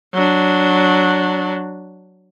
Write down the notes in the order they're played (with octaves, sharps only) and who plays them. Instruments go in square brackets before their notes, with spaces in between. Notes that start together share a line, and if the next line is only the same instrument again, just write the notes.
[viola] F#3 D4